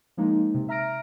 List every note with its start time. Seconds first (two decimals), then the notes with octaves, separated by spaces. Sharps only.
0.17 F3 G#3 A#3 D#4
0.54 C3
0.68 E5 A#5 F6 A#6 D7